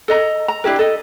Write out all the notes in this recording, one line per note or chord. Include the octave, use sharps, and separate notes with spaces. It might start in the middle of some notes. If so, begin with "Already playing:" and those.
A4 D#5 A#5
A#5
D4 E4 G4 A#4
A4 D#5